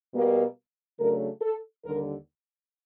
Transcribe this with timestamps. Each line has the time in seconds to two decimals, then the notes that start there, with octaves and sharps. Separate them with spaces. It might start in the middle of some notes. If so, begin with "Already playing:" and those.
0.13 B2 G3 A#3
0.99 C#3 F#3 A3 D4 A#4
1.41 A4
1.84 D#2 D3 G3 A#4